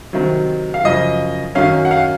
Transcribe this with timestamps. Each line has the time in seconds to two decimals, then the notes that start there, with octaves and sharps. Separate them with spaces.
0.13 C3 D#3 F#3
0.74 F5
0.84 F#2 C#3 F3 D#5
1.55 F#2 D#3 F#3 C#4 F5
1.85 F#5
1.91 F5